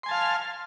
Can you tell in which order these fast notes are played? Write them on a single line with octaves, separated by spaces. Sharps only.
C6 G#5 A5 F5 F6